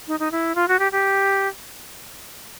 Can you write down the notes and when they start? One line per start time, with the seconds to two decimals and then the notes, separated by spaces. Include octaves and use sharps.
0.08 D#4
0.20 D#4
0.32 E4
0.55 F4
0.68 F#4
0.79 G4
0.92 G4